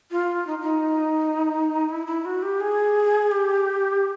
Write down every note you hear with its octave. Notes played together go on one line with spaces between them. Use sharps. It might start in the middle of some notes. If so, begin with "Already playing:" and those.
F4
D#4
D#4
E4
E4
F#4
G4
G#4
G4